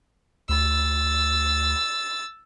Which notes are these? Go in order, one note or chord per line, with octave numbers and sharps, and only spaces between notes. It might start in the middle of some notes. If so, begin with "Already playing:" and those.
D2 E6 A6